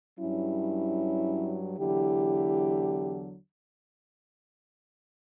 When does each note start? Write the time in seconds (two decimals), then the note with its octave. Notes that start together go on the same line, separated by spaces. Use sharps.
0.19 G2 F#3 C#4 E4
1.78 E2 D3 F#3 E4 G4